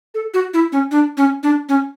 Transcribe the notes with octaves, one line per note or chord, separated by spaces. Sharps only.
A4
F#4
E4
C#4
D4
C#4
D4
C#4